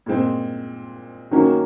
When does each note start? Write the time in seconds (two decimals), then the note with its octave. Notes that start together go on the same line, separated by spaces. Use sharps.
0.06 A#2 G#3 C4
1.31 D#3 F#3 A#3 C#4